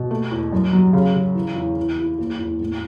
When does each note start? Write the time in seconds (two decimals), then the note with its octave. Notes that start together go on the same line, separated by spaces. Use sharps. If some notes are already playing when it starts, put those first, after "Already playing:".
Already playing: B2
0.11 A3
0.31 E2
0.52 F#2
0.73 F#3
0.93 C#3
1.14 C#3
1.35 E3
1.56 E2
1.76 E3
1.98 E4
2.18 F#1
2.39 E2
2.60 A2